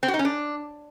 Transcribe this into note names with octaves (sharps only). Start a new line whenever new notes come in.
C4
F#4
D#4
C#4
D4